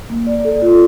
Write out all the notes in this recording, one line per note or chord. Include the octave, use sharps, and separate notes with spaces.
A#3
D5
A4
F4